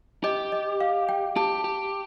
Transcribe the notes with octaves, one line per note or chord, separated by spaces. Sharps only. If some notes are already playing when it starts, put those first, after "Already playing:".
G4 D#5
D#5
F5
G5
G4 A5
G4